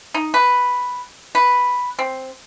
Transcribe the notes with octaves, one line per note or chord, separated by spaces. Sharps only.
D#4
B4
B4
C4